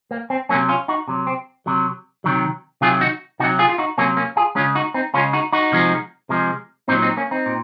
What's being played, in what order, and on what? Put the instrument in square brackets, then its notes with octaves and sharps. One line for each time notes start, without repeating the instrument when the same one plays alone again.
[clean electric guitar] A#3
C4
C3 F#3 A#3 C#4
C#4 F4
D#4 F#4
C3 F#3
C4
C3 F#3
C3 D#3 F#3
C3 D#3 F#3 F4 G#4
D#4 F#4
C3 D#4 F#4
F#3
F4 G#4
F4
D#4 F#4
C3 F#3 A#3 C#4
A#3 C#4
F4 G#4
C#3 G#3 C#4 F4
D#4 F#4
C4 D#4
C#3 G#3 C#4 F4
D#4 F#4
D#4 F#4
C3 F3 G#3
C3 F3 G#3
A#2 F#3 C4 D#4
C4 D#4
A#3 C#4
C4 D#4
A#2